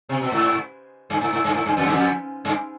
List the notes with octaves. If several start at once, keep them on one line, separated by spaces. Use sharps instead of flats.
C3
B2
G#2
G2
G#2
G#2
G2
G#2
G2
F2
G2
F2
G2